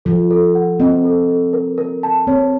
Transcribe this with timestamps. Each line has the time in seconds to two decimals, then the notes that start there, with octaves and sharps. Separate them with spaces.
0.05 F3 A4
0.31 A4
0.55 F#5
0.80 C4 D#5
1.04 A4
1.28 A4
1.53 A#4
1.78 A#4
2.03 A5
2.27 C4 C#5